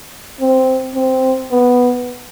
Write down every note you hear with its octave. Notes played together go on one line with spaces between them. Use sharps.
C4
C4
B3